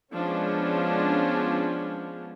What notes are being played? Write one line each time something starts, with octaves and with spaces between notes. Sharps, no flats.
F3 G#3 B3 C#4 D4